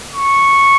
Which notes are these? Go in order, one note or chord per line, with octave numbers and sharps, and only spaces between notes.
C#6